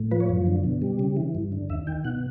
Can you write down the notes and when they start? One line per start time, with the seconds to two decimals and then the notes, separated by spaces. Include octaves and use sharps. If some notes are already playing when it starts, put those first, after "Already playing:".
Already playing: A2
0.11 F3 B4
0.20 C#5
0.29 F#2
0.47 D3
0.64 B2
0.82 G3
0.99 C#3
1.17 E3
1.35 G2
1.52 D3
1.69 D#2 E5
1.87 D#3 G5
2.05 B2 F#5